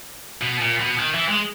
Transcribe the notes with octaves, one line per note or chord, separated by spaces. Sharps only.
B2
A#2
B2
D#3
E3
G#3